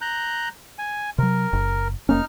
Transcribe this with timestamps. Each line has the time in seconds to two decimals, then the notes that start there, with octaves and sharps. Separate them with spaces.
0.01 A#5 F#6 G6
0.79 G#5
1.18 C3 F#3 A#4
1.53 F#1
2.09 F1 A#3 C#4 D#4 F6